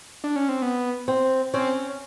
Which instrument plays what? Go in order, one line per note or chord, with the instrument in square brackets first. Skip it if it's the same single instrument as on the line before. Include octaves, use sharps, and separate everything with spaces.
[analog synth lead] D4
C#4
C4
B3
[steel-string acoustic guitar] C4
[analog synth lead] C4 [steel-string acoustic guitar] C#4